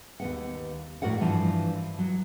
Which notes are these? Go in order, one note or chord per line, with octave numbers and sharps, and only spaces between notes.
D#2 B3 F#5
F2 A2 F#4 A#4 D5 F#5
G2 E3 F3
F#3